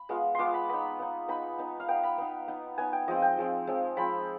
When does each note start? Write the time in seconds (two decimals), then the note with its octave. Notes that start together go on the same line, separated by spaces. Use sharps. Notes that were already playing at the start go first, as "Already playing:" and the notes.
Already playing: B5
0.09 G#3 B3 F4
0.35 G#3 B3 F4 C6 D6
0.54 B5
0.69 B3 D#4 B5
0.99 B3 D#4
1.28 B3 D#4 B5
1.58 B3 D#4
1.80 F5
1.88 B3 D#4 G5
2.03 B5
2.18 B3 D#4
2.48 B3 D#4
2.78 B3 D#4 G#5
2.93 G5
3.08 F3 G#3 C4 D#5
3.22 G5
3.37 F3 G#3 C4
3.67 F3 G#3 C4
3.97 F3 G#3 C4 B5